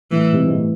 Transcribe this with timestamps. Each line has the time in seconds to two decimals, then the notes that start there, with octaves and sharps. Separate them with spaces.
0.11 A2 E3
0.33 G#2 C3
0.48 G#2
0.54 A2